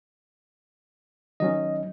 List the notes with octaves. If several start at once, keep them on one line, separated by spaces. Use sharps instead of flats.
D#3 F#3 C#4 D#5